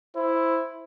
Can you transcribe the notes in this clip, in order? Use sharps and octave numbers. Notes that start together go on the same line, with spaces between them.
E4 C5